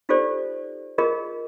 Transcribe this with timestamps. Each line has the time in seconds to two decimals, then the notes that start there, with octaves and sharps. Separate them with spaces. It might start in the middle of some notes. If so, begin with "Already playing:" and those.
0.09 D#4 F4 G4 A4 C5 D5
0.98 F4 G#4 A#4 D#5